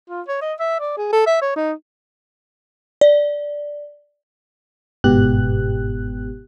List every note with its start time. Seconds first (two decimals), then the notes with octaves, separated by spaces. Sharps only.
0.09 F4
0.28 C#5
0.42 D#5
0.59 E5
0.80 D5
0.97 G#4
1.13 A4
1.27 E5
1.42 C#5
1.56 D#4
3.01 D5
5.04 G1 G#2 B2 B3 G4 F#6